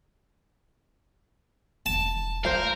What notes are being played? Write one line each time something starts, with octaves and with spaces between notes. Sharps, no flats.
E1 A5
G3 A3 A#4 C5 F5